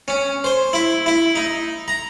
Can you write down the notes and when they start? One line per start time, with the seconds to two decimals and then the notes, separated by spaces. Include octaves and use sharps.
0.08 C#4
0.44 C5
0.73 E4
1.06 E4
1.35 D#4
1.88 A#5